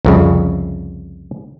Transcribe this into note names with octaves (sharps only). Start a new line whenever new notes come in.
C2 F2 C#3